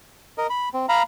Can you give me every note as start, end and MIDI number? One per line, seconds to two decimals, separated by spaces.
0.38 0.47 70
0.38 0.47 75
0.50 0.69 83
0.74 0.86 60
0.89 1.03 77
0.89 1.03 82
0.89 1.03 83